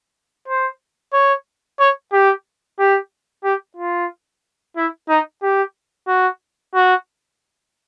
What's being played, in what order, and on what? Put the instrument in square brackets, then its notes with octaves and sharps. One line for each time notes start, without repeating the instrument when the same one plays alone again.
[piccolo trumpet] C5
C#5
C#5
G4
G4
G4
F4
E4
D#4
G4
F#4
F#4